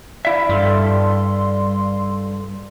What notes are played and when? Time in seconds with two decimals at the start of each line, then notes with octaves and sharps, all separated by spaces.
0.25 E4 D5 E5 F5
0.49 G2 G3 A4 C6